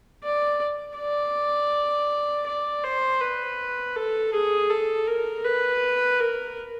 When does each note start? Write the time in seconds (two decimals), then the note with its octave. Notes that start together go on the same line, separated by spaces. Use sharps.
0.23 D5
0.98 D5
2.46 D5
2.84 C5
3.21 B4
3.96 A4
4.34 G#4
4.70 A4
5.07 A#4
5.45 B4
6.20 A#4